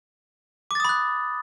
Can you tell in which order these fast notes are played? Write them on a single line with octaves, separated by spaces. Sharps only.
D6 A6 D#6 B5 F#6